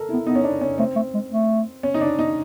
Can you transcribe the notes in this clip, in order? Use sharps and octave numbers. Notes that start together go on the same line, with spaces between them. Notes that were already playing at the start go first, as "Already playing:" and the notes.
Already playing: A4 A#4
B3 E4
B3 D#4
C#4
D4
C#4
A3 C4
A3
G#3
A3
C#4
D#4
D4
D#4